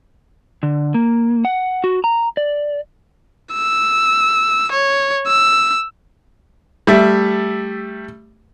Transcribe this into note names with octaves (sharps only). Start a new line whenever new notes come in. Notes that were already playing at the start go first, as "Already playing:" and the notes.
D3
A#3
F#5
F#4
A#5
D5
E6
C#5
E6
G3 A3 E5